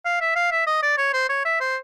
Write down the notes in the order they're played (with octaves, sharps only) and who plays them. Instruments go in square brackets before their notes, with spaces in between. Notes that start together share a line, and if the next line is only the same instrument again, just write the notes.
[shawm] F5
E5
F5
E5
D#5
D5
C#5
C5
C#5
E5
C5